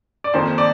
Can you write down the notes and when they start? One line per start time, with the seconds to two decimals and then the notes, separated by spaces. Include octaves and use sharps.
0.24 D5
0.33 F2 D#3 A#3 C5
0.58 D5